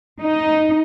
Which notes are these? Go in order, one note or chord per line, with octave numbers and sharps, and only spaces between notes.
D#4